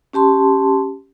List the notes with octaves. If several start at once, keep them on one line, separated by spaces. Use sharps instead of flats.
C#4 G4 A5 C6